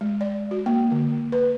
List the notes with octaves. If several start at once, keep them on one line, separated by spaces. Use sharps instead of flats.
G#3
D5
F#4
A#3
D3
B4